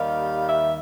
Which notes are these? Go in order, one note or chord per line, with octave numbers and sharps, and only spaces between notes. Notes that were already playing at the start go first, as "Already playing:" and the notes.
Already playing: D#2 D#3 G3 F5
E5